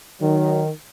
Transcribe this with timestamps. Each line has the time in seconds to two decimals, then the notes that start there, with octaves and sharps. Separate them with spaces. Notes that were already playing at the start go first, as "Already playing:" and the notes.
0.21 D#3 F#3